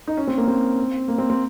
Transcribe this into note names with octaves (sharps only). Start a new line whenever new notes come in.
D#4
C#4
C4
A#3
C4
A#3
C4
C4